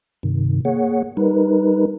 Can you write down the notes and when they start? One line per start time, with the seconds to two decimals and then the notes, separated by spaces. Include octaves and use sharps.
0.23 G2 C3 D#3
0.65 A#3 G#4 C#5 F#5
1.17 G3 D#4 A#4 B4